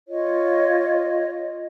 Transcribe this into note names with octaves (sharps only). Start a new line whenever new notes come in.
F4 C#5 D#5